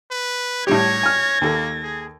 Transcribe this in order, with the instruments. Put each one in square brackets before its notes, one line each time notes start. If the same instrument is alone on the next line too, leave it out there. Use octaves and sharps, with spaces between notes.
[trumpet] B4
[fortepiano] A2 G3 G4 [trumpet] C#5 [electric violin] G#6 A#6
[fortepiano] G#5 F6
[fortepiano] D#2 A4 [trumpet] A#3
[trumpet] G#4